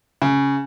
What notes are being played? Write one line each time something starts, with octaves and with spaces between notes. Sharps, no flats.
C#3